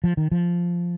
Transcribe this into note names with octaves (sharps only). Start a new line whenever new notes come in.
F3
D#3
F3